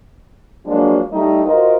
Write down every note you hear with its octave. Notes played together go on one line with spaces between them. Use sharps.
F3 F#3 G#3 A#3 D4
G3 A3 D#4
F4 F#4 A#4 C5 D#5